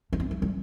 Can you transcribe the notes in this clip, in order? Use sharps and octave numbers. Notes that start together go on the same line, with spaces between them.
A3
B3
A3
G3